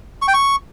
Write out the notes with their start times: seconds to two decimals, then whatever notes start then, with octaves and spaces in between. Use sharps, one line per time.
0.22 C#6
0.28 G5
0.34 C#6